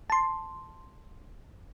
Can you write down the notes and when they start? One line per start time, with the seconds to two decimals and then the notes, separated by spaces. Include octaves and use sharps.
0.10 A5 C6